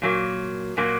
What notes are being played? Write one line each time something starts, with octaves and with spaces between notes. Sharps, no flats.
A#2 F#3 A#3
A#2 F#3 A#3